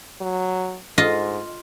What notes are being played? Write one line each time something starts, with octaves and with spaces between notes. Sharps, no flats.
F#3
G#2 F4 D#5